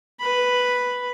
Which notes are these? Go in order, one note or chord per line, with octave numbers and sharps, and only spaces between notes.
B4 B5